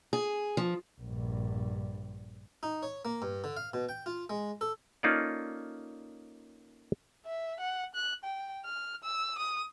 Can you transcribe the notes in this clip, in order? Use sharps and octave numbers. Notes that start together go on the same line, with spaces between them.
G#4
F3
A#1 G2
D#4
C#5
A#3
G2
D3
F5
B2
G5
F4
G#3
A4
A#3 C#4 D#4 F4 A4 D5
E5
F#5
F#6
G5
F6
E6
D#6